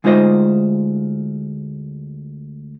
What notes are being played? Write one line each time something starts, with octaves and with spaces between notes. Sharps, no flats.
D2 G#3 D#4 F4 C5 D#5